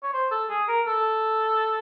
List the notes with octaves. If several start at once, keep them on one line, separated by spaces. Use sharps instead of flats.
C#5
C5
A4
G#4
A#4
A4